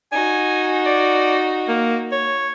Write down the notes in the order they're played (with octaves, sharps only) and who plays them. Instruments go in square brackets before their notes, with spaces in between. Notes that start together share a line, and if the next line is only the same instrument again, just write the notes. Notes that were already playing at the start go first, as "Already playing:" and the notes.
[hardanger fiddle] D#4 F#4 [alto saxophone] G#5
[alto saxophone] D5
A#3
C#5